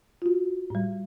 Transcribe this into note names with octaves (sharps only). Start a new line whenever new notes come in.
F4 F#4
A2 G3